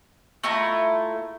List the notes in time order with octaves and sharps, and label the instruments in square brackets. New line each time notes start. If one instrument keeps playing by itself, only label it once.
[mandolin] A3 E4 F4 A#5